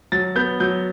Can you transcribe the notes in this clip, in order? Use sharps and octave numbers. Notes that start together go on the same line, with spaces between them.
F#3 A6
B3 G6
F#3 G6